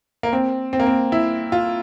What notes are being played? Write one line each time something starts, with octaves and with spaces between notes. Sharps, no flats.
A#3
C4
C4
A#3
C4
E4
F4